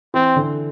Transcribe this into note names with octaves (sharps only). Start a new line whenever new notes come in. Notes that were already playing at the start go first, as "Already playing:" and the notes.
E3 C4
D3